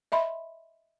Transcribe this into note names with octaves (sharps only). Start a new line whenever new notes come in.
D#5 E5 B5 C6